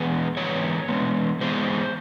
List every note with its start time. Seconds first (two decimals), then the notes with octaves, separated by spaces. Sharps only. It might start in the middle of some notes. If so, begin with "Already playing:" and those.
Already playing: E3 G#3 B3
0.37 E3 G#3 B3 C#5
0.88 E3 G#3 B3
1.41 E3 G#3 B3 C5